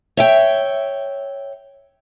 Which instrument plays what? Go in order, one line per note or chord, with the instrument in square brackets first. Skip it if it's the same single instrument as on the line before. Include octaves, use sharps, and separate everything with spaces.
[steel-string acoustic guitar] C#5 E5 G5